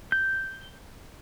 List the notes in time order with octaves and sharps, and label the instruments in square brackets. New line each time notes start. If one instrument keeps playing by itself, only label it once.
[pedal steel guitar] G6